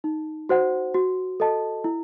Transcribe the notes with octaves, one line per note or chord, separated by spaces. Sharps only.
D#4
F#4 C5 F#5
F#4
A4 D#5 A5
E4